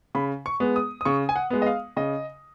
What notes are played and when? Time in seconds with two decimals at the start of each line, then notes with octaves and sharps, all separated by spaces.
0.15 C#3 B5
0.46 C#6
0.60 G#3 B3
0.76 D#6
1.01 D#6
1.05 C#3 C#6
1.29 G#5
1.36 F#5
1.50 G#3 B3
1.62 D#5
1.66 F5
1.97 C#3 D#5